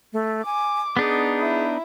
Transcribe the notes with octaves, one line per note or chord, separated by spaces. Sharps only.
A3
G#5 D6
B3 D4 D#4 G#4
E4